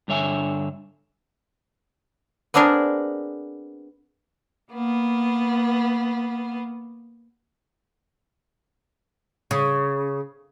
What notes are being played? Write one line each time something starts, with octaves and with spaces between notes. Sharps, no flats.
G2 D3 C#5 E5 G#5
B3 C4 D4 G#4 A#4
A#3 B3
C#3